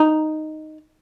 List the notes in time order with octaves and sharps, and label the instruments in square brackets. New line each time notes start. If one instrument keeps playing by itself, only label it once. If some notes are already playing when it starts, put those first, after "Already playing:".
Already playing: [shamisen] D#4